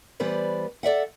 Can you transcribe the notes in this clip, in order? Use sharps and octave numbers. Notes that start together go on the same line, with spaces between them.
E3 G3 B3 B4 C5 D5
A4 D5 E5 F#5